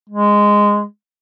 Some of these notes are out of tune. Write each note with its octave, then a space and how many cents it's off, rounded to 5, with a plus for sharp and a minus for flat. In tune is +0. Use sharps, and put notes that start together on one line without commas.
G#3 -10